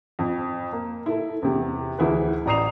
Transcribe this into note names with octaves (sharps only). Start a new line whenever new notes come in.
F2
A#3
E4 A4
E2 C3
D2 E3 E4 G#4 B4
A1 D5 A#5 D#6 C7 F7